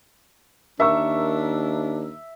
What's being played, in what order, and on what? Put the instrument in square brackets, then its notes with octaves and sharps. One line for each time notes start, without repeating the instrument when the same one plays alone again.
[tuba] D#2 [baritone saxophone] D4 [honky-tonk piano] A#4 C#6 E6 [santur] E5